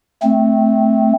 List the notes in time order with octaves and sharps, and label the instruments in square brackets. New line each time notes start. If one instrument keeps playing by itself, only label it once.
[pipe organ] A3 C4